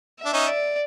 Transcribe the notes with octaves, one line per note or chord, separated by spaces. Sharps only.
E5
D4
C#4 D#4
D5